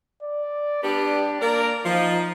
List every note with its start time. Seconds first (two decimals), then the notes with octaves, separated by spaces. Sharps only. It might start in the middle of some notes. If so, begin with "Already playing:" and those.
0.22 D5
0.84 G3 B3 D4 G4
1.41 A#3 A#4 D5
1.85 F3 D#4